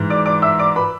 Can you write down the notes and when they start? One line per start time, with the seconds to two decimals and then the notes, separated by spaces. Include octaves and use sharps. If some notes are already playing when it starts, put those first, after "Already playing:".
Already playing: G#2 E3
0.10 D5 D6
0.26 D5 D6
0.42 E5 E6
0.59 D5 D6
0.76 B4 B5